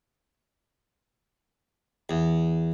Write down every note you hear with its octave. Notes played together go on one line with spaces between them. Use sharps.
E2